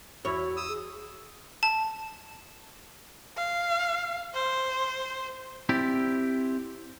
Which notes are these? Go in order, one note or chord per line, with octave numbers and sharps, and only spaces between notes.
E2 E4 F#4 C#5
D#6 E6
G#4
A5
F5
C5
C4 E4 G4 D5